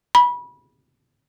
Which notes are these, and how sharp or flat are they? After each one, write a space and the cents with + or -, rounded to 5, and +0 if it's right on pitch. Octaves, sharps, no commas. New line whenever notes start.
B5 -25